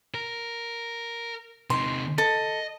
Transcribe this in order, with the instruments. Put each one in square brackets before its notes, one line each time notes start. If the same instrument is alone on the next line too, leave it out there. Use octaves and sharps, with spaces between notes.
[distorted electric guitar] A#4
[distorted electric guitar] C3 D#4 [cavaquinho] C6
[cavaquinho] A4 [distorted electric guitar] D#5